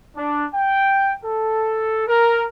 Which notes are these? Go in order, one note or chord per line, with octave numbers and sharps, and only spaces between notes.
D4
G5
A4
A#4